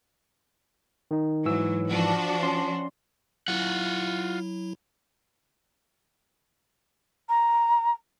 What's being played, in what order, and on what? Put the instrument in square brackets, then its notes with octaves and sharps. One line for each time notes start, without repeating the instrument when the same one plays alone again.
[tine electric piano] D#3 D#4
[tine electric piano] G#2 E3 E6 [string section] F#3
[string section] F3 D4 F#4
[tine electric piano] C#4 C6
[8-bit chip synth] F#3 E4 [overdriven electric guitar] F4 F#5
[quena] A#5